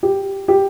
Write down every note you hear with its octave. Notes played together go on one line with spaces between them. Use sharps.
G4
G4